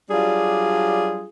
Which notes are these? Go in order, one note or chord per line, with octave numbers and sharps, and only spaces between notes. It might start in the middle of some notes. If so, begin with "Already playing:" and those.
F#3 G3 D4 F4 G#4